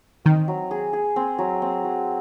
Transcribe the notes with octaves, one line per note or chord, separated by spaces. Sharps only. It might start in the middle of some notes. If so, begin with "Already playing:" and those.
D#3 C4
F#3
G#4
G#4
C4
F#3
C4
F#3